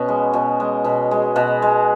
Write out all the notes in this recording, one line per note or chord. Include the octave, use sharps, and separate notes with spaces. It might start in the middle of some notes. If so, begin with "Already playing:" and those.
Already playing: B2 B3 C#4 F#4
G#3
B2
G#3
B2
G#3
B2 F#5
G#3